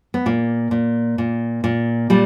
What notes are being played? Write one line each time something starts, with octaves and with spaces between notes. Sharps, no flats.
B3
A#2 A#3
A#2
A#2
A#2
A#2 G3